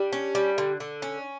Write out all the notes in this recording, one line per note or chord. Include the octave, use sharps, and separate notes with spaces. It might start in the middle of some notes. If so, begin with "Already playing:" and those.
Already playing: G3 D4
C#4
G3
D3
D3
C#4